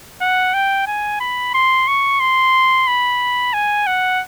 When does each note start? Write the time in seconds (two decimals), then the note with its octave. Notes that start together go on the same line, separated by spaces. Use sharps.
0.21 F#5
0.54 G5
0.87 G#5
1.20 B5
1.54 C6
1.87 C#6
2.20 C6
2.87 B5
3.53 G#5
3.87 F#5